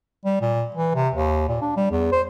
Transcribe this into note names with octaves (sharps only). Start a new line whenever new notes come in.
G3
A#2
E3
C3
D#2
A#2
D4
G3
E2
C5